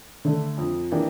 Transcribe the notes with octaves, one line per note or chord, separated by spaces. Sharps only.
D3 A3 D4
F2
E3 A#3 D4 G4